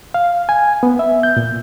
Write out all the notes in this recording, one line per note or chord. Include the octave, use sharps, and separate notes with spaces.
F5
G#5
B3
E5
G6
A#2